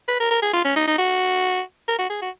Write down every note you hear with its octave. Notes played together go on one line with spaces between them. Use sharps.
B4
A#4
A#4
G#4
F4
C#4
D#4
D#4
F#4
A#4
F#4
G#4
F#4